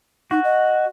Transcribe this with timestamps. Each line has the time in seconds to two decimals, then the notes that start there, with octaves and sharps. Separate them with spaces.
0.31 D#4 F#4
0.44 D#5